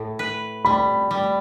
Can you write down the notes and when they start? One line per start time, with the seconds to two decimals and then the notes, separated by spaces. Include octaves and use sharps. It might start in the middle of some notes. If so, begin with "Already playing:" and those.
Already playing: A2
0.19 B4
0.65 G3 B5
1.11 G3